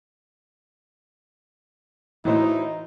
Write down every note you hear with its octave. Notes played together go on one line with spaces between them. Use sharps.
A2 E3 D#4 E4 F#4 C5